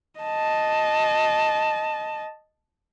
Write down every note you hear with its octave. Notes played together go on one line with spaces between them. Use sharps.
D#5 A5